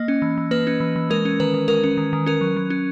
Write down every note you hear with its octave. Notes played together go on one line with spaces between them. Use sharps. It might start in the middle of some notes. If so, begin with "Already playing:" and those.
Already playing: A#3 D#5
C#4
E3
E3
A#3 B4
C#4
E3
E3
G#3 A#4
C#4
D#3 B4
D#3
G#3 A#4
C#4
D#3
D#3
C#4 A#4
F#3
F#3
C#4